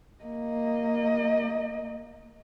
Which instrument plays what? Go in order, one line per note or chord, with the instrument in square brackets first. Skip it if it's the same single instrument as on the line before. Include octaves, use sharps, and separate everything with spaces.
[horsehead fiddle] A#3 D#5